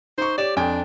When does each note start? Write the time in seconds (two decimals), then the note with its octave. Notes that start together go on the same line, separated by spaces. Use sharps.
0.18 D#4 C5 C#6
0.38 G4 C#5 D5 E7
0.57 F2 D4 G5 G#5